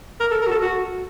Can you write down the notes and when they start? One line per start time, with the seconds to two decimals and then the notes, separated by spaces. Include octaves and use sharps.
0.20 A#4
0.31 A4
0.42 A#4
0.47 F#4
0.51 A4
0.62 F#4